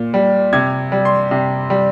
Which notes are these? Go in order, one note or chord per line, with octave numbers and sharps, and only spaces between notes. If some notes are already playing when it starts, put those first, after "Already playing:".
Already playing: A#2
G3
C3 G#6
G3
C6
C3
G3